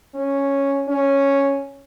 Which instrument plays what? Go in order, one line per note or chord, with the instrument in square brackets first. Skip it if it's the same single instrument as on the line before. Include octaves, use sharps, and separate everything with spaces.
[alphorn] C#4
C#4